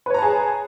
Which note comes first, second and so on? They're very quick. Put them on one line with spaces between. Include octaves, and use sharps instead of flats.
B4 C#5 A#5 A5 G#4